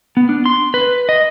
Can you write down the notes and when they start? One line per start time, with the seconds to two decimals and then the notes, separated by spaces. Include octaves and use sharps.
0.17 B3
0.29 D4
0.46 C6
0.74 B4
1.09 D#5